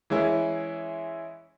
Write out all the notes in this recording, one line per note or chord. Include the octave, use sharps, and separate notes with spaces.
E3 G#3 C#4 E4 G#4